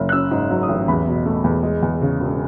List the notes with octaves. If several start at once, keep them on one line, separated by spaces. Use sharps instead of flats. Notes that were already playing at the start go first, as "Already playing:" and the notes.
Already playing: F#1
F#6
C#4 E6
G#2
F#3
D#6
A1
E2 B5
B2
A3
E2
G#3
E2
C#3
E1